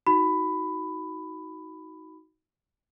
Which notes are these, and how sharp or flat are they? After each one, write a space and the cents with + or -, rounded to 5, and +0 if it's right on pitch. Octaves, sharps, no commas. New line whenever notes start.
D#4 +20 F#4 +0 B5 +15